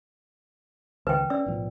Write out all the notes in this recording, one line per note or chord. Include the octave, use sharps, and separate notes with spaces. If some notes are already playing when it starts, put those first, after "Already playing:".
C#2 D#3 B4 G5
C#4 D5 E6
B1 A2 F3